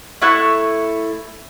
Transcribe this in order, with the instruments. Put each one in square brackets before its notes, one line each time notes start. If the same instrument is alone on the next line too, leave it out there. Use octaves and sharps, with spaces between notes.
[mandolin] A3 E4 C#6 F#6